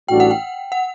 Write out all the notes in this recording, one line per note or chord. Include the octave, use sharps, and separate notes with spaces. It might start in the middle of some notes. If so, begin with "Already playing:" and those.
A1 A2 G3 D4 F#4 G5
F#5
G5
F#5